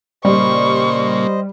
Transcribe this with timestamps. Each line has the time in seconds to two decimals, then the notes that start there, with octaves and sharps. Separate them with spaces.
0.25 A#2 C#3 G3 A#3 C5 D#5 C#6